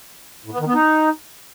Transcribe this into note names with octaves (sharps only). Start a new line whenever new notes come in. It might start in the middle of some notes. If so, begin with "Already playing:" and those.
A2
B3
D#3
B3
D#4